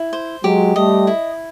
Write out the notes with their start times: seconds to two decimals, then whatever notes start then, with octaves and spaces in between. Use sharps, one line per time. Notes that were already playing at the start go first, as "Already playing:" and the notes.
Already playing: E4
0.13 C5
0.44 F#3 G#3 G4
0.75 G3 A3 D#5
1.07 E4